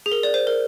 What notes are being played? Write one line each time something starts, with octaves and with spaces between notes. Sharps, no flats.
G#4
A#4
D5
C5
A#4